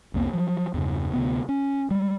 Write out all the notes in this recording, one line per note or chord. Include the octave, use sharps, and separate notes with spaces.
C2 F2 A#3 B3
F3 F#3
E2 G2 C#3
D2 C3 B3
C#4
G3 G#3